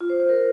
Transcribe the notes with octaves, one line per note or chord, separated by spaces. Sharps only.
F4
C5
C5
A#4